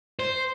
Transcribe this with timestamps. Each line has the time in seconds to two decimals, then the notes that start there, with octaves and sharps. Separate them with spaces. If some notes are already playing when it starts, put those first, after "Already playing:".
0.19 C5